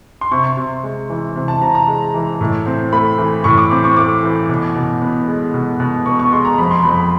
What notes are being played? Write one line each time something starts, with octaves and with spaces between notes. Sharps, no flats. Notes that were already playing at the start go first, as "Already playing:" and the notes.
C6
C3 C#6
C3
G#3
E3
C3
A5
C3 A#5
A#5
G#3
E3
A2
C4
A3 B5
E3
A2 C#6
D6
C4 D6
C#6
A3 D6
E3
B2
B2
B3
G#3
B2
B2
B3 C#6
C#6
G#3 C6
A#5
F2 B5
C6
F2 B5